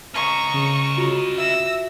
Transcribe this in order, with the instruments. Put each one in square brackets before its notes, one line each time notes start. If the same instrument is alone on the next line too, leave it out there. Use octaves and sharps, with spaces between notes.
[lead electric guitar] C#4 D#5 [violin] A#5 C#6
[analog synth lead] C#3
[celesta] F4 F#4
[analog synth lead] E5 [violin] E6 A#6